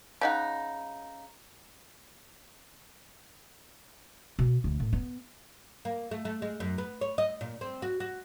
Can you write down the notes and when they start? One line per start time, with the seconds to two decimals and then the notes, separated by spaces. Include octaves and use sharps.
0.21 C#3 D#4 F#5
4.39 B2
4.64 D2
4.80 A2
4.93 B3
5.85 A#3
6.11 A3
6.25 A3
6.42 G#3
6.60 F#2
6.78 B3
7.01 C#5
7.18 D#5
7.41 A#2
7.61 C4
7.82 F#4
8.00 F#4